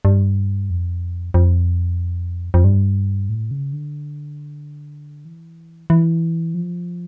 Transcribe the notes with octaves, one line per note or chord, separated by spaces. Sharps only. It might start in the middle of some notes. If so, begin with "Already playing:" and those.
G2
F2
F2
F2
G2
A2
C#3
D3
E3
E3
F3